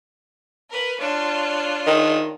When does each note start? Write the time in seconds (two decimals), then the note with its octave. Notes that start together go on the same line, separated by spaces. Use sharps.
0.69 A#4 B4
0.98 D4 F4 C#5
1.87 D#3